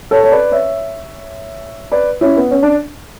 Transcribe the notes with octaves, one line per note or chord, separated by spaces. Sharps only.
A4 C#5
C#5
B4 D5
C#5 E5
B4 D5
C#4 E4
B3
C#4
D4